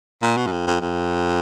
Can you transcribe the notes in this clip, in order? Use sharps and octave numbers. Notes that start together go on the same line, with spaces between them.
A#2
B2
F#2
F2
F2
F2